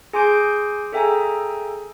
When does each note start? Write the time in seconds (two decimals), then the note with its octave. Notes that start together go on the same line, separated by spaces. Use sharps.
0.13 G#4 G#5 C6 D6 G6 D7
0.92 G#4 A4 E5 G5 G#5 A#5